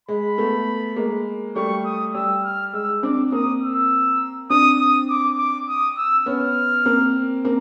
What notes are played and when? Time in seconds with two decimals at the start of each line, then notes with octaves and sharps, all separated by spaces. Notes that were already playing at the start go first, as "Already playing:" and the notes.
0.08 G#3 B5
0.38 A3 B3
0.96 G#3 A#3
1.55 G3 A3 C#6
1.85 D#6
2.14 G3 E6
2.44 F6
2.73 G#3 E6
3.03 C4 D4 D6
3.32 A#3 C4 D#6
3.62 E6
4.50 C4 D4 D#6
4.80 D#6
5.09 D6
5.38 D6
5.68 D#6
5.97 E6
6.26 B3 C#4 F6
6.85 A#3 C4
7.45 A#3 C4